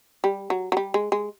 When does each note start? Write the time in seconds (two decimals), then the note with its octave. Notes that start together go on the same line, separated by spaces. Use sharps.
0.24 G3
0.50 F#3
0.72 F#3
0.77 G3
0.94 G#3
1.12 G#3